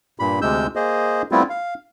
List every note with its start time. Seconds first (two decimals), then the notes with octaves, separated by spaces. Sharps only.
0.20 G2 A#2 B5
0.42 D2 C3 G#3 E6 G6
0.76 A#3 G#4 C5 D#5
1.32 G3 A3 B3 C4 E4 F4
1.50 F5